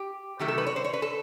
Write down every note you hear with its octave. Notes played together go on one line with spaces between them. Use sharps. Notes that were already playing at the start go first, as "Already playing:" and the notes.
Already playing: G4
C3 D#3 F#3 A3 G4
A4
B4
C#5
C5
C#5
B4
A4